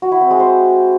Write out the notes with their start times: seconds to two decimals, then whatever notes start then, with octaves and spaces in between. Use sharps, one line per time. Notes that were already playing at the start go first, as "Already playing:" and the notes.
0.02 F#4
0.12 E4
0.21 C4
0.30 G#3
0.40 C5